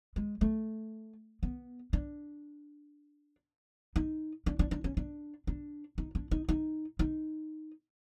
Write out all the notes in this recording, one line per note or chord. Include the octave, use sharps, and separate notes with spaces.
G#3
A3
B3
D4
D#4
D4
D4
D4
C#4
D4
D4
D#4
D4
D#4
D#4
D#4